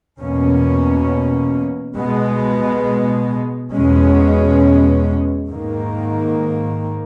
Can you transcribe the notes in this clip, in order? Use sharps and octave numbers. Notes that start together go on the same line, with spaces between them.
E2 B2 A#3 C#4
B2 G#3 B3
E2 B2 G#3 C#4
G#2 D#3 A#3